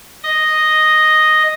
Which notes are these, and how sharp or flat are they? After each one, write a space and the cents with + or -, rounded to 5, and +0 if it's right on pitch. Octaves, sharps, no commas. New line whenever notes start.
D#5 +0 D#6 -5